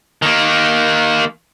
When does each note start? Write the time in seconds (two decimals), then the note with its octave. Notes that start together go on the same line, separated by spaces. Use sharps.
0.22 D#3 A#3